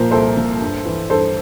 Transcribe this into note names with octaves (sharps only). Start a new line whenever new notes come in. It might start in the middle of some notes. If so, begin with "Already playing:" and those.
Already playing: A#2 F3 A#4 C5
C2 A4 C5
A#2 F3
G2
E3
G2 A4 C5